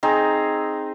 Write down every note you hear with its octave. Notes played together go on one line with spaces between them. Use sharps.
C4 D#4 G#4 A#5